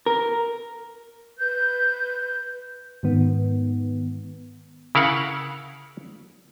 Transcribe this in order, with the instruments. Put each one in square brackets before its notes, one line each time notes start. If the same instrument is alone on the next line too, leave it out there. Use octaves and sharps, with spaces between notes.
[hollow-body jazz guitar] A#4
[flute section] B4 G6
[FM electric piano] G#2 D#3 B3
[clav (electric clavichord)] C#3 E4 A#4 F5 F#5